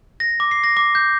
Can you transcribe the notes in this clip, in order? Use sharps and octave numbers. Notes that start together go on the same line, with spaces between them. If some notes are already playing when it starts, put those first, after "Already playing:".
A#6
D6
C7
A#6
D6
G6